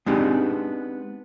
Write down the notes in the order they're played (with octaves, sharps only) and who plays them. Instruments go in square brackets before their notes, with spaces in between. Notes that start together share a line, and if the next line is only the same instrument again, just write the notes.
[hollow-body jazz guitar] G#3 B3 C4 D4 D#4 G4